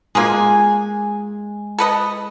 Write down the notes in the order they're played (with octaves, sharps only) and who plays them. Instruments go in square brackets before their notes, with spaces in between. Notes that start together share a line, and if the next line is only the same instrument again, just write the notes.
[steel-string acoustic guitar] G#3 G#5 [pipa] A#3 F4 G#4
[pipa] A4 B4 D#5